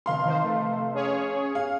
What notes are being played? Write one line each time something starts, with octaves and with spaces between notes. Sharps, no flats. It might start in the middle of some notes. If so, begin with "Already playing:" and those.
F1 F5 C6
D#3 E3 C5
A3
C#4 G#4 C#5
F5